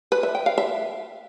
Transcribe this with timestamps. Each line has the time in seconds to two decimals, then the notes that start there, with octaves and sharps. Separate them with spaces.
0.12 B4
0.23 E5
0.35 G5
0.46 F5
0.58 E5